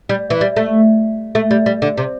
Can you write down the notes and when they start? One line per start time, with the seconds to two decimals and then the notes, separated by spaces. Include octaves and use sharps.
0.09 G3
0.30 E3
0.41 G3
0.56 A3
1.35 A3
1.51 G3
1.66 G3
1.82 D3
1.97 C3